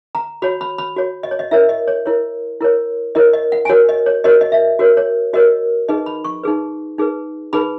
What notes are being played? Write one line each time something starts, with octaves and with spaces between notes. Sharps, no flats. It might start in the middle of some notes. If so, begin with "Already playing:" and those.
A#5
F#4 C#5 B5
B5
B5
F#4 C#5
D#5
C#5
D#5
E4 A#4 C#5 E5
D#5
C#5
E4 A#4 C#5
E4 A#4 C#5
E4 A#4 C#5 D#5
D#5
F#5
G#5
F#4 A#4 C#5 F#5
D#5
C#5
F#4 A#4 C#5 D#5
D#5
E5
F#4 A#4 C#5
C#5
F#4 A#4 C#5 D#5
D#4 G#4 B4 D#5
B5
C#6
D#4 G#4 B4
D#4 G#4 B4
D#4 G#4 B4 B5